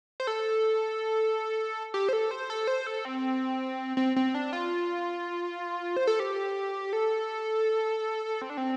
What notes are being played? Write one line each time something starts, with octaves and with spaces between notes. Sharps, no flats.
C5
A4
G4
C5
A4
C5
A4
C5
A4
C4
C4
C4
D4
F4
C5
A4
G4
A4
C4
D4
C4